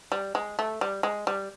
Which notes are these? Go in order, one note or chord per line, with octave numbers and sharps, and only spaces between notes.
G3
G#3
A3
G3
G#3
G3